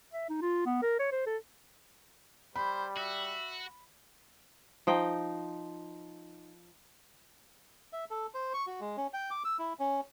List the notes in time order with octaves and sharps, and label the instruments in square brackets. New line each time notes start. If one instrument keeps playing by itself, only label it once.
[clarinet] E5
D#4
F4
B3
A#4
C#5
C5
A4
[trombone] G3 [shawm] C5 [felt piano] B5
[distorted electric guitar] F#4 [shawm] E5
[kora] F3 D#4 G5
[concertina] E5
A4
C5
C#6
F#4
G#3
C#4
G5
D6
E6
E4
C#4